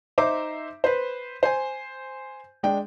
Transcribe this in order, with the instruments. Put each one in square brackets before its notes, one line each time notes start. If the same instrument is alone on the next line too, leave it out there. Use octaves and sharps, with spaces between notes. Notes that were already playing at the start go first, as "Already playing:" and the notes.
[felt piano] D#4 C5 E5 A#5 D6
B4 C5
C5 G#5
G#3 D4 G5